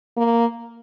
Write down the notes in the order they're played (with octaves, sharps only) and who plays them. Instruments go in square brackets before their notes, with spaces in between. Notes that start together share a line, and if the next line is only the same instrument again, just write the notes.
[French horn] A#3